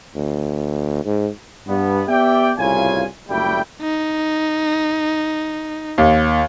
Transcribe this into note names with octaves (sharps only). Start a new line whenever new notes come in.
D2
G#2
G2 B3
B3 G4 D5 E5 G5
C2 A2 C#3 F4 G#5
F#1 D2 G3 A3 E4 G5
D#4
D#2